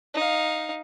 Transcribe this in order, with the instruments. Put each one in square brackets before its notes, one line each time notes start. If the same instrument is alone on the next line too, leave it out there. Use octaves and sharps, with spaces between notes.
[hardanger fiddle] D#4 F5